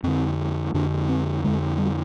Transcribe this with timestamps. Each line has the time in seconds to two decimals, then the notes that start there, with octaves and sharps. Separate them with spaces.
0.03 F2 D3 C4
0.74 F2 D3 D4
1.09 C4
1.44 F2 D3 G#3
1.78 G3